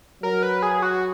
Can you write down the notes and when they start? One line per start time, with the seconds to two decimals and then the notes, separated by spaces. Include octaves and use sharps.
0.23 F#3 A#4
0.43 B4
0.62 G#4
0.82 F#4